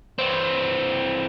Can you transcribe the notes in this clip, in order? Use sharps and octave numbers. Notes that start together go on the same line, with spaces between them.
E3 C4